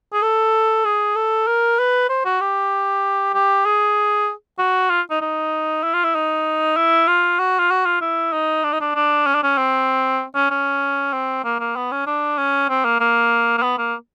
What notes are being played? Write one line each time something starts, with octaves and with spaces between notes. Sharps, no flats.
G#4
A4
G#4
A4
A#4
B4
C5
F#4
G4
G4
G#4
F#4
F4
D#4
D#4
E4
F4
E4
D#4
E4
F4
F#4
F4
F#4
F4
E4
D#4
D4
D#4
D4
D4
C#4
D4
C#4
C4
C#4
C#4
C4
A#3
A#3
B3
C#4
D4
C#4
C4
A#3
A#3
A#3
B3
A#3